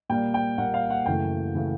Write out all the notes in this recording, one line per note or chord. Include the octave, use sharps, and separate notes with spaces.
A#2 G3 A#3 G5
G5
A#2 G3 A#3 F#5
F5
F#5
F#2 C#3 E3 A3 G5
C#3 E3 A3